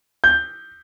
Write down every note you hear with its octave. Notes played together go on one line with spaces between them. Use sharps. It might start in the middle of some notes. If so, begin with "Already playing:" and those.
G6